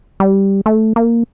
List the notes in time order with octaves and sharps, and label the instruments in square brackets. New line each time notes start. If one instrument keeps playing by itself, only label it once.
[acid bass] G3
A3
A#3